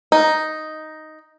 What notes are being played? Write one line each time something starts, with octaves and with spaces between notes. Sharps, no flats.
D#4